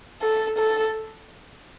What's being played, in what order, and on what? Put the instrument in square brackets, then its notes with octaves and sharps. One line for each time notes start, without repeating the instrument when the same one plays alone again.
[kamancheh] A4
A4